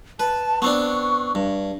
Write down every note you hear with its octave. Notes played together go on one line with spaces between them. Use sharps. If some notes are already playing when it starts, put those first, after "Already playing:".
B4 A5
B3 C4 D4 C#6
G2